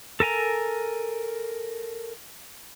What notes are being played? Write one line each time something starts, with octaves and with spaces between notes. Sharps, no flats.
A4 A#4 G#5 A#5